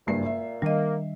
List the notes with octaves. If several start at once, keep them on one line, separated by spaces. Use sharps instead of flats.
F#1 G2 A#2 C7
E5
D#3 G3 A#3 D4 D#5